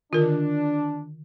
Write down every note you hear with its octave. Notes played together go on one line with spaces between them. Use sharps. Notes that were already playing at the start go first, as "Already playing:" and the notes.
D3 D#3 D4 F4 A#4